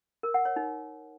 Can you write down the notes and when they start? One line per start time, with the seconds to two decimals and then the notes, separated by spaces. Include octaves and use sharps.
0.23 A#4
0.34 F#5
0.45 C#5
0.56 D#4